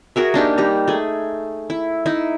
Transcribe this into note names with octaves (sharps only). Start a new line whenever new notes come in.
F#4 G#4 A#4 E5
A#3 D4 D#4 G4
G3 D#4 A#5
A3 G#4
E4
D#4 E4